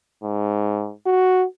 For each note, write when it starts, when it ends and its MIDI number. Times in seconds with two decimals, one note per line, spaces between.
0.23 0.92 44
1.06 1.45 66